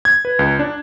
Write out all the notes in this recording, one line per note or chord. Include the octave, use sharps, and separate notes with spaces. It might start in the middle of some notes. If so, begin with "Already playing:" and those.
G#6
B4
C#2
D4